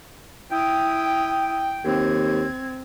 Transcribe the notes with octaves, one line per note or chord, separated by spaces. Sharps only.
E4 G5 D#6
D#2 C4 G#6